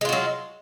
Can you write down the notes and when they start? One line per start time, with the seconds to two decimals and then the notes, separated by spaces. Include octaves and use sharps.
0.01 G#3
0.05 F4
0.09 F#4
0.12 F#3